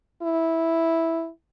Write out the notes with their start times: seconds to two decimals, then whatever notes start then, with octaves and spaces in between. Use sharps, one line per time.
0.22 E4